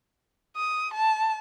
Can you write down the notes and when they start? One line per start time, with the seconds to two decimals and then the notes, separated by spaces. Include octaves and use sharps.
0.56 D#6
0.94 A5